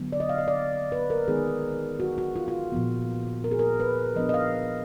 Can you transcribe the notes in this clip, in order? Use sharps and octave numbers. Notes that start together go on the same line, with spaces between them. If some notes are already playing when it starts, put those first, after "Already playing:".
Already playing: D3 F#3 B3
D5
D#5
F5
D#5
D5
B4
A#4
D#3 G#3 B3 D#4 G#4
F#4
F#4
F4
F4
A#2 F3 B3
A#4
G#4
A#4
B4
F3 B3 D4 D#5
D#5
F5